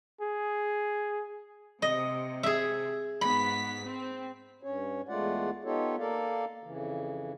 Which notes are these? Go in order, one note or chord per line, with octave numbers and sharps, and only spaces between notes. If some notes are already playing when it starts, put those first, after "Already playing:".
G#4
C3 D#5
G#4 E5
G#2 B3 B5 B6
C4
G2 C#4 C#5
E2 G#3 A3 F4 D5 F#5
B3 D#4 F4 G4 A4 C#5
A#3 A4 A#4 D5 F5
F2 C#3 E3